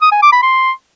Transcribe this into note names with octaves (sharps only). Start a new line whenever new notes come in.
D#6
G#5
D6
B5
C6